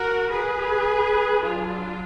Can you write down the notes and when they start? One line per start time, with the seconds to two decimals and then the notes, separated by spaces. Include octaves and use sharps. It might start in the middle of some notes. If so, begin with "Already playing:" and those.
Already playing: F#4 A#4
0.30 G#4 B4
1.43 F#3 D4 F4